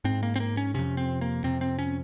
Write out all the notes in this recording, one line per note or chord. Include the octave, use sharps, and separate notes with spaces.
G#2 C4
A#3
C4
A#3
C#4
F2 C3 C#4
C4
A#3
F2 C3 C4
C4
C#4